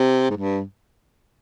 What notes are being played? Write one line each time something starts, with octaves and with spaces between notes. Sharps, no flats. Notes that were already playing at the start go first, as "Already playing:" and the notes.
Already playing: C3
G#2
G2